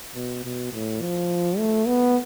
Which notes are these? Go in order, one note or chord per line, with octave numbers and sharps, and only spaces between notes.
B2
B2
A2
F3
A3
B3